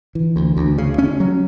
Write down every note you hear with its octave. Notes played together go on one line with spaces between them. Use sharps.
E3
D2
D2
C#3
C#4
F#3